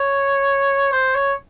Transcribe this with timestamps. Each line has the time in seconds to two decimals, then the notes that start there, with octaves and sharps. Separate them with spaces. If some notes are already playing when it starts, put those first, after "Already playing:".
Already playing: C#5
0.92 C5
1.15 C#5